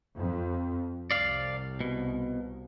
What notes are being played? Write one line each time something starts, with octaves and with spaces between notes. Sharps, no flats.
F2
C2 D5 F5
B2